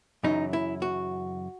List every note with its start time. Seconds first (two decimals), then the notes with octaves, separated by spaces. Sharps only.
0.23 F#2 C#3 E3 D#4
0.53 E4
0.82 F#4